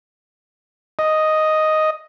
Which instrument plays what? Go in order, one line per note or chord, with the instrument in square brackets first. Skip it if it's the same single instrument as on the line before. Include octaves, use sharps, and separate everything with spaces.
[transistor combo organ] D#5